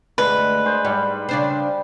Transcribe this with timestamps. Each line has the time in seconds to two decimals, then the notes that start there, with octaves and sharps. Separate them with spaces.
0.18 D2 G#3 B4
0.65 G#4 C5 D5
0.85 G#2 G3
1.29 C#3 D4 C5